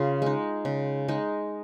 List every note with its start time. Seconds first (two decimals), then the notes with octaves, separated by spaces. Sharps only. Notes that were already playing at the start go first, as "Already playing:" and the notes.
Already playing: C#3 F4 G#4
0.22 G#3 D#4
0.65 C#3
1.08 G#3 D#4